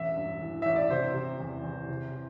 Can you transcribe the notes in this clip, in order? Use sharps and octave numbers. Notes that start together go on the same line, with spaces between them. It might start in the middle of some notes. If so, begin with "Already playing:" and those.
Already playing: E1 A1 E5
G2
E3
A1 E5
D5
C3 C5
C3
E2
E2
C3
E3